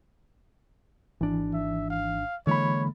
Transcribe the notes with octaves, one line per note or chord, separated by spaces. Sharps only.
G#1 E3 D4
E5
F5
D3 E3 G#3 A#3 C#5 B5